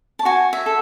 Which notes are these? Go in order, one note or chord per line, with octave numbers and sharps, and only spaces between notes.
A5
F#4 G#5
E5
A4